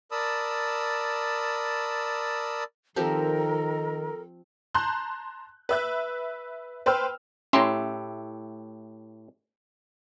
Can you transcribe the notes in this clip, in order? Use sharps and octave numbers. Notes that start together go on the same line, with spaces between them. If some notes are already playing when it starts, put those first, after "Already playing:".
A#4 D5 A5 B5 D#6 E6
D#3 F3 C4 G4 A4 A#4
A5 A#5 C6 F#6 G6
B4 E5 F#6
B4 C5 G5 E6 F6
A2 C#4 G4 E5 A#5 C6